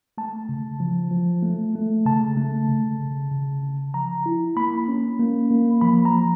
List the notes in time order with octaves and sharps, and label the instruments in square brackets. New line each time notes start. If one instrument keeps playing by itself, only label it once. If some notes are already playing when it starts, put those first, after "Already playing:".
[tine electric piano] A3 A5
C#3
F3
F3
A3
A3
C#3 A5
A3
C#3
C#3
C#3
C#3
F3 A#5
E4
A#3 B5
C#4
A#3
A#3
F3 B5
A#5
F3